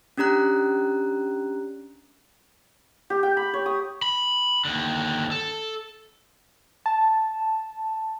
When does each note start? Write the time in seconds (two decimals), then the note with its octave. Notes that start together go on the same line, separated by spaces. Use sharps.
0.17 C#4 D4 G4 A#5 F#6
3.10 G4
3.23 G5
3.37 B5
3.54 C#5
3.66 D#6
4.02 B5
4.65 D#2 D3
5.31 A4
6.86 A5